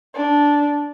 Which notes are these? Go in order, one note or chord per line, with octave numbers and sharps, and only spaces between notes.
D4